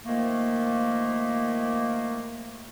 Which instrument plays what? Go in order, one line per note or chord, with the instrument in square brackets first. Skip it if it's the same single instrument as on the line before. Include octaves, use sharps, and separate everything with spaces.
[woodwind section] D#3 F3 A3 A#3